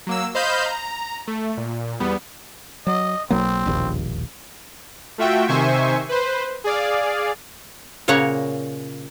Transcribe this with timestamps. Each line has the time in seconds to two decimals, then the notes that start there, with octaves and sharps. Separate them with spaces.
0.07 F#3 A#3 E6
0.35 C5 D#5 F5 B5 F6 G6
0.66 A#5
1.27 A3
1.57 A#2
2.00 E2 G3 B3
2.87 F#3 D#5
3.30 B1 F#3 A#3 C4
3.66 E1 A#1 D#2
5.18 A3 F4 F#4 E5 G5
5.48 C3 D#3 C5 E5 G#5 C#6
6.09 B4 C5
6.64 G#4 D5 F5
8.08 A#2 C#3 A#3 C#5 F#5 A#5